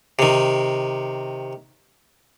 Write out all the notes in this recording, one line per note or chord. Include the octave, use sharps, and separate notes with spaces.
C3 D#3